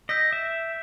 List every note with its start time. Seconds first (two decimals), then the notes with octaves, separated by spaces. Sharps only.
0.09 D#5 E6 G6 B6 D7
0.33 E5